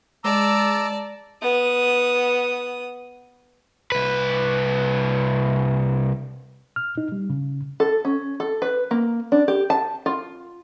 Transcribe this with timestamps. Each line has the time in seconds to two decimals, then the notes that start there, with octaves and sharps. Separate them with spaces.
0.24 G#3 D5 A5 A#5 D6 E6
1.42 B3 D#6
3.92 C2 B4
6.76 F6
6.98 D#4
7.12 G3
7.30 C#3
7.80 A4
8.05 C#4
8.40 A4
8.62 B4
8.91 A#3
9.32 D4
9.48 G4
9.70 A5
10.06 F4